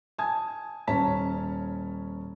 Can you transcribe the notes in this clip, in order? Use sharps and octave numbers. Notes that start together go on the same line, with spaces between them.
G#5 A5 D#6 G#6
D#1 C#4 C#5 A5 A#5 B6